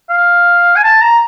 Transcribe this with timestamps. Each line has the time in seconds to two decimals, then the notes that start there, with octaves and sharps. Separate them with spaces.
0.10 F5
0.76 G#5
0.84 A5
1.01 A#5